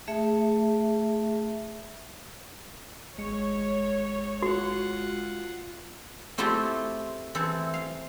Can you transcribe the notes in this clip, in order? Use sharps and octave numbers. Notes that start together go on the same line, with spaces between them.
A3 G#4 E5
G#1 G#3 C#5 C#7
F4 F#4 F#5
A3 C4 E4 F4 G4 A4
E3 C4 E4 A4
F5